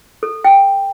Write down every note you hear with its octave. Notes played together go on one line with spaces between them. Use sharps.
A4
G5